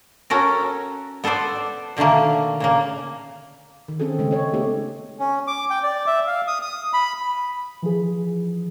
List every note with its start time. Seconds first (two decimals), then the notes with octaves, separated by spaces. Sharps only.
0.30 C#4 F#4 A4 A#4
1.24 B3 A4 B4 C5 D5
1.97 B2 D3 D#3 A3 A#3
2.60 A#2 C#3 A#3
3.88 D#3
4.00 D#3 C4 C#4 G#4 A4
4.19 C#3 G#3 A3
4.31 A4 C#5
4.54 A3 B3 D#4 G4
5.19 C#4
5.47 D6
5.70 G5
5.83 D5
6.07 E5
6.27 F5
6.47 D#6
6.61 D#6
6.93 B5
7.82 E3 F3 G#4